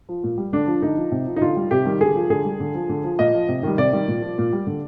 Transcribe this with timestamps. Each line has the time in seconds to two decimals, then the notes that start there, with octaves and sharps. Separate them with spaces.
0.09 F3
0.24 A#2
0.38 G3
0.53 D3 D4
0.67 F3
0.82 D3 D#4
0.97 F3
1.12 C3
1.26 F3
1.36 D#4
1.41 D3 F4
1.56 G3
1.71 C3 G4
1.85 D#3 G3
2.00 D3 G#4
2.15 F3
2.30 D3 G#4
2.45 G3
2.60 D3
2.75 F3
2.89 D3
3.04 F3
3.19 A#2 D#5
3.34 F3
3.48 C3
3.63 D#3 G3
3.78 C3 D5
3.93 D#3 G3
4.08 A#2
4.22 F3
4.38 A#2
4.53 G3
4.67 D3